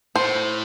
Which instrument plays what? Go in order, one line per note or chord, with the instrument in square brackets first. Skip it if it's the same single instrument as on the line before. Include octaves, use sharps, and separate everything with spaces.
[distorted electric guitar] A2 [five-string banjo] C5